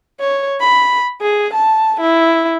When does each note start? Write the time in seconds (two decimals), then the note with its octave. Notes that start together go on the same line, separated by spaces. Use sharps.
0.20 C#5
0.60 B5
1.21 G#4
1.54 A5
2.01 E4